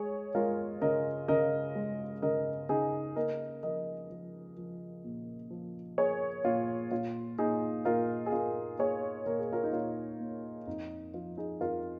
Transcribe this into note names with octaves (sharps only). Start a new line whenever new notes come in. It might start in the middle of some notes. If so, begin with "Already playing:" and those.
Already playing: G#3 G#4 C#5
G#3 F4 A#4
C#3 A#4 D#5
C#3 A#4 D#5
G#3
C#3 A#4 D#5
C#3 D#4 G#4
A#3 A#4 D#5
F3 A#4 D#5
F3
F3
A#2
F3
A#3 G#4 C#5
A#2 F4
A#2 F4
A#2 D#4 G#4
A#2 F4 A#4
G#4
A#3 F4 A#4
A#3 G#4 C#5
A#2 A#4
G#4
F4 A#4
D#4
A#2 F4
A#3
F2 D#4
F3 F4
D#4 G#4
F2 F4 A#4